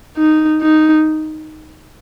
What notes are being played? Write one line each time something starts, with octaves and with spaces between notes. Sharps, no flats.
D#4
D#4